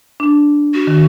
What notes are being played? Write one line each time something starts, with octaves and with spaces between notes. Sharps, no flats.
D4
F#4
D#3